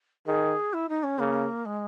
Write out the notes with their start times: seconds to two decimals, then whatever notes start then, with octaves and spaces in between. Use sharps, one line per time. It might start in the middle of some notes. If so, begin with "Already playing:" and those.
0.26 D#3 G#4
0.73 E4
0.89 D#4
1.03 C#4
1.19 C#3 A#3
1.65 G#3